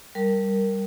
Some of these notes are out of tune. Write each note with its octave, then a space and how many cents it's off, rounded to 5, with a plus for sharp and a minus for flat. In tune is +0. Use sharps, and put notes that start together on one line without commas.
G3 -5 A#4 +0